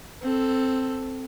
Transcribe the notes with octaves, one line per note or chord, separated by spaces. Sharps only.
C4 A4